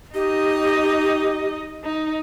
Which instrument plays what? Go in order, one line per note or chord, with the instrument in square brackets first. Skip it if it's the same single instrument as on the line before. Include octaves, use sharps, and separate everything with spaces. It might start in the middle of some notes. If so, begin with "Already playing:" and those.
[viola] D#4 D#5 [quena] G4
[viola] D#4